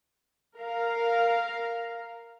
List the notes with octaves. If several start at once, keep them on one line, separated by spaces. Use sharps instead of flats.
A#4 F5